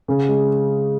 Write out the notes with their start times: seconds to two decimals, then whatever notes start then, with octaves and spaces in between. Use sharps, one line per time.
0.08 C#3
0.29 G#3